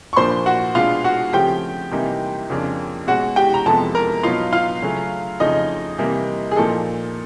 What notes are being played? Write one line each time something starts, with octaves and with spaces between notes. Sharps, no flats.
C#6
A#2 F3 A#3 D4 C5 C6
F#4 F#5
B2 G#3 B3 D4 F4 F5
F#4 F#5
C#3 F3 A3 C4 G4 G5
C3 E3 G3 A#3 D#4
F2 C#3 F3 A#3 D4
B2 G#3 C#4 F#4 F#5
G4 G5
A#5
F2 C3 F3 G#3 B3 A4 A5
A#4 A#5
B2 F#3 B3 D#4 F4 F5
F4 F5
C#3 F#3 A3 C#4
F2 C#3 F3 A3 D#4 D#5
C3 E3 G3 A#3
G#4
A#2 F3 A#3 D#4 A4